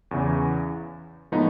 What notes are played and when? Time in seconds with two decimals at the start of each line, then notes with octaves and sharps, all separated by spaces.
0.11 E2 C#3 E3
1.32 A2 F3 G#3 B3 D#4